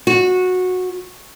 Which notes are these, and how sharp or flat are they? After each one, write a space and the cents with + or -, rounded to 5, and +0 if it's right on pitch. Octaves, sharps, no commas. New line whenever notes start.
F#4 -15